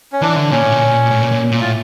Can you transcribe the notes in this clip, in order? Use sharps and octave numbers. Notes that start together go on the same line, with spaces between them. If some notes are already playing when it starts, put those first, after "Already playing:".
C#4
E3 D4
D3
A#2 C#4
A2
A#2
A2
A#2
A#2
A#2
A2 F4